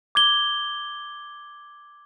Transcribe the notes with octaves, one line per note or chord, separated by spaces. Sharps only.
D6 G#6 G7